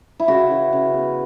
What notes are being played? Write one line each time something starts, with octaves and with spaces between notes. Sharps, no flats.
E4
C#3 F#4
E3
C#3
B3